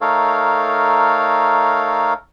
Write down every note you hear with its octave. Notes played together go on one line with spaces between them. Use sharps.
A3 D#4 A4 A#4 C#5 F5